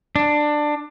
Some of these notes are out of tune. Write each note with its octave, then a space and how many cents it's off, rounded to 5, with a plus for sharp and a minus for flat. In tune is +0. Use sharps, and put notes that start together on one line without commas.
D4 +15